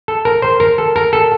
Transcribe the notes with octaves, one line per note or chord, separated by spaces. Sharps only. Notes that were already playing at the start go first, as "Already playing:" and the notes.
A4
A#4
C5
A#4
A4
A#4
A4